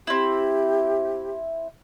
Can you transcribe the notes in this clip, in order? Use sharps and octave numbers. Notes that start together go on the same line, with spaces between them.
C4 E4 G4